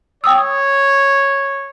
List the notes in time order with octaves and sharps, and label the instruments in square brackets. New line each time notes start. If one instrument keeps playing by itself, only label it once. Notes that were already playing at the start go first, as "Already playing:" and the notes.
[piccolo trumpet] C#5 [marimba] G5 D#6 E6